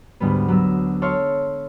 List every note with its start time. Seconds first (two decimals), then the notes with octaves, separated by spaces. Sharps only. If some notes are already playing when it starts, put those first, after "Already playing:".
0.20 D2 G#2 G3 B3
0.48 F#3 B3 E6
1.02 A4 C#5 E5 C6 C#6 F6